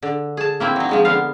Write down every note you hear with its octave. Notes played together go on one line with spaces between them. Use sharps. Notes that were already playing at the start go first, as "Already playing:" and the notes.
D3
G#4 A5
A#3 C4 E4
F#3 D#4
F3 G#3 D#4
D3 B3 F5